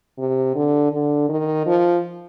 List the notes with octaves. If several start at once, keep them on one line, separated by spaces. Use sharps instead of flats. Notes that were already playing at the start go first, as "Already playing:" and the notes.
C3
D3
D3
D#3
F3